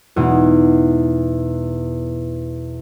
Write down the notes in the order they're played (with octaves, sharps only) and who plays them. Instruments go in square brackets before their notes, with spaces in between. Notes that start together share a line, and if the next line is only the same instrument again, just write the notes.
[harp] E2 B2 G#3 D#4